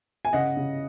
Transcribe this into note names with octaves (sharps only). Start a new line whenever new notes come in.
G#5
C#3 D#5 F#5
C#3